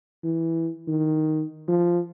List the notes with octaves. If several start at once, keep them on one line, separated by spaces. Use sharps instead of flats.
E3
D#3
F3